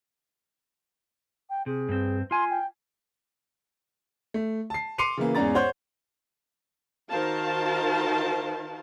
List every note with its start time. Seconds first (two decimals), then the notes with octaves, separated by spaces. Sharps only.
1.50 G5
1.66 C3 G#4
1.89 G2 C4
2.31 F4 G#5 C6
2.50 G5
4.34 A3
4.70 A5 C7
4.98 C6 D6 C7 C#7 D#7 F7
5.17 C#3 E3 A#3
5.35 E2 G#2 C#4 D5 A#5 A6
5.55 C5 C#5 F#5 C6 G6
7.10 D#3 F#4 A#4 C5 F5 A5